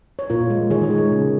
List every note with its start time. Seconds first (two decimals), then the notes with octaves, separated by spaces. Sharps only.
0.19 C#5
0.30 A#2 F4 A#4
0.50 G#3
0.70 D#3 G#4 C#5
0.84 G#4 C#5
0.90 G#3
0.97 F4 A#4
1.12 C#3